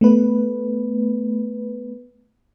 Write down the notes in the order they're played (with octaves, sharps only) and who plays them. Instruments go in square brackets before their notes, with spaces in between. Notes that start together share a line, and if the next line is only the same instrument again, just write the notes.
[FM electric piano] A3 B3 B4